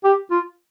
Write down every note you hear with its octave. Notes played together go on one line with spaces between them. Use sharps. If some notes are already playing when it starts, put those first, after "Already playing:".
G4
F4